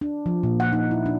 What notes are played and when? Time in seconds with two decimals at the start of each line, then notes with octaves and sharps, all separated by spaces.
0.01 D4
0.26 F3
0.43 A#2
0.60 F#5
0.73 D#4
0.91 E4
1.06 D4